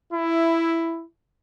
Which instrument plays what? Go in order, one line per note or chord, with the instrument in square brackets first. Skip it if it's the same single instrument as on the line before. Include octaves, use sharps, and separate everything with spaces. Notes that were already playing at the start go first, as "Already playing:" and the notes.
[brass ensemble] E4